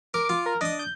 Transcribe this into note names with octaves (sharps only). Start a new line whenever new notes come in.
A#4 D6
F4 D6
A#4
D4 D#5 D#6
G6